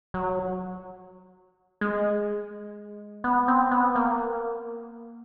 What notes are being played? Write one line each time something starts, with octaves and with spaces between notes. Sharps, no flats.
F#3
G#3
B3
C4
B3
A#3